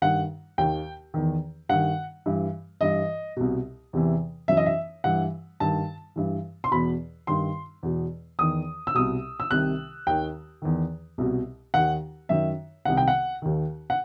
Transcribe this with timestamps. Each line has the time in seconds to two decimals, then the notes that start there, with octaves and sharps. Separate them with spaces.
0.02 G2 D#3 F#5
0.58 D#2 D#3 G5
1.14 E2 D#3
1.69 G2 D#3 F#5
2.26 G2 E3
2.81 G2 E3 D#5
3.37 C2 B2
3.93 E2 C3 E3
4.48 F#2 E3 E5
4.57 D#5
4.66 E5
5.04 G2 E3 F#5
5.60 G2 D#3 A5
6.16 G2 E3
6.64 C6
6.71 E2 B2 B5
7.27 G2 D#3 C6
7.83 E2 B2
8.39 E2 D#3 D#6
8.87 E6
8.94 C2 B2 D#6
9.40 E6
9.51 C2 C3 D#3 F#6
10.07 D#2 D#3 G5
10.62 E2 D#3
11.18 C2 B2
11.74 D#2 D#3 F#5
12.29 F#2 D#3 E5
12.85 C2 C3 D#3 F#5
12.97 G5
13.08 F#5
13.42 D#2 D#3
13.90 F#5